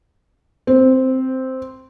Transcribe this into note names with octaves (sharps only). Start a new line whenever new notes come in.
C4